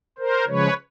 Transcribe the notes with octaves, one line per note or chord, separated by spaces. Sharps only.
A#4 C5
C#3 F3 G#3 B4 C#5